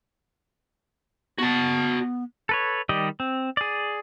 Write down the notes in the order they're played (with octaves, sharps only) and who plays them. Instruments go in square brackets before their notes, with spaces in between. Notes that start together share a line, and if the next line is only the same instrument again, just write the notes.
[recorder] B3 [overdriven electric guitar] F#4 A5
[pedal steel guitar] A4 B4 C#5
D#3 G3 G4 D5 D#5
C4
G#4 D5